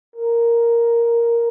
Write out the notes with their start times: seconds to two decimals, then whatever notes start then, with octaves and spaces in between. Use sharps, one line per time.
0.16 A#4